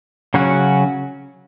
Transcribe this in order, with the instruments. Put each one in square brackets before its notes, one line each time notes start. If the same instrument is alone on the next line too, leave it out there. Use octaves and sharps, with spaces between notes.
[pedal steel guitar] C#3 F#3 C#4 F#4